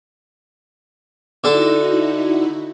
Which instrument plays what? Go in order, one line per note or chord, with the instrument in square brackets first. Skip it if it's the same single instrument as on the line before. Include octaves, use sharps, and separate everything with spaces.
[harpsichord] D3 A4 [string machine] D#4 E4 F#4